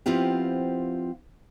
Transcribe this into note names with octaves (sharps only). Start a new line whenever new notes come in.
F3 B3 C4 E4 F4 G4